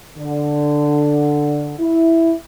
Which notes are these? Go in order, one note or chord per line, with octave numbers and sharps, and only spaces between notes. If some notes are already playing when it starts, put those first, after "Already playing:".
D3
E4